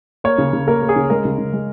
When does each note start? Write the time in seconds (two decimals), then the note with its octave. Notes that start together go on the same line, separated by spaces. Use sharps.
0.24 A#3 C#5
0.38 C#3
0.53 C#3
0.68 A#3 A#4
0.82 A#3
0.89 G#4
0.96 C#3
1.10 G#3 A#4
1.25 C#3
1.38 C#3
1.53 G#3